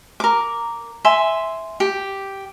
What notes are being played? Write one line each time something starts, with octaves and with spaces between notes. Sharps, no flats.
A#4 D6
E5 G#5 C6
G4